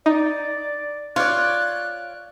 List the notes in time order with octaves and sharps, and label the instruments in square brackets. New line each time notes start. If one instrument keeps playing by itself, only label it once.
[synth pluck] D#4 [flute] D5
[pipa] F4 [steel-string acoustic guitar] C#5 D5 [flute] F#6